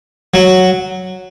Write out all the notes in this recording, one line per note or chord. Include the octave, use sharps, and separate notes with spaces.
F#3